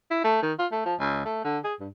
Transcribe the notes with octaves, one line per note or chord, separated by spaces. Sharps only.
E4
A3
D#3
F4
A3
F3
C#2
A3
D3
G#4
G2